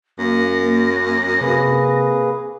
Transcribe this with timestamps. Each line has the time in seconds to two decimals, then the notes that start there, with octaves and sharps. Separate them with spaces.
0.19 F#2 A#3 A#6
1.41 C3 A#3 G#4 B4